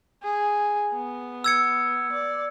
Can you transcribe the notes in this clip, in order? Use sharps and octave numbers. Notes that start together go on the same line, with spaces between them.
G#4
B3
E6 G#6 C#7
D5